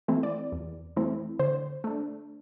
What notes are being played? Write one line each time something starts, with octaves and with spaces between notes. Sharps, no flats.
E3 A3 C4 E4
D5
E2
E3 A3 C4 E4
D3 C5
A3 D4